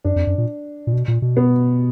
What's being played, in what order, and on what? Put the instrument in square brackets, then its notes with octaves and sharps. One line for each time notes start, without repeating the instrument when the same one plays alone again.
[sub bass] F#2 [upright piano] D4
[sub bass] F2
F#2
A#2
A#2
B2
A#2
B2
[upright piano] B3